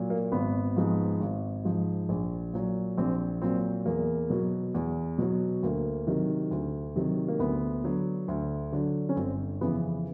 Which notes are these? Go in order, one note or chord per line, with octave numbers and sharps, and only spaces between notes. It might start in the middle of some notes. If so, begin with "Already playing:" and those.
Already playing: A#2 F#3
A#3
G#1 B3
G#2 F3
G#1
G#2 F3
A#1
A#2 F#3
A#1 C4
A#2 F#3 C4
E2 A#3
B2 F#3
E2
B2 F#3
D2 A#3
C3 D#3 F#3
D2
C3 D#3 F#3
A#3
D2 B3
D3 F#3
D2
D3 F#3
C#4
G1 C4
F2 C#3 E3 B3